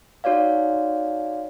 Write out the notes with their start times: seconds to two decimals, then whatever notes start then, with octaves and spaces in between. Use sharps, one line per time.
0.24 D#4 F#4 C#5 D5 F5